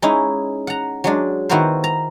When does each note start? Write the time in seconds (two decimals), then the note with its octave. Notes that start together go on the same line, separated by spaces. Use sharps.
0.02 G#3 C#4 D#4 E4
0.67 F#5 A#5
1.04 F#3 G#3 D4
1.49 D#3 B3 E4 F#4 A#4 C5
1.84 A#5